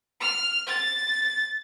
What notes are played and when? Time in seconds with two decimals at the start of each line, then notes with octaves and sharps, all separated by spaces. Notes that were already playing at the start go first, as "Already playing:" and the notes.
0.21 F6
0.67 A6